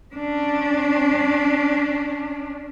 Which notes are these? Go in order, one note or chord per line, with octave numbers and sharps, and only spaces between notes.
C#4 D4